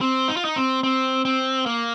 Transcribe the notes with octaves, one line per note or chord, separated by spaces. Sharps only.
C4
D#4
F4
D#4
C4
C4
C4
A#3